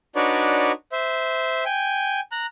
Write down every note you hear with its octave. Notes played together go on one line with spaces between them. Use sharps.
D4 D#4 F#4 B4 C#5 D5
C5 E5
G5 G#5
A#5 F#6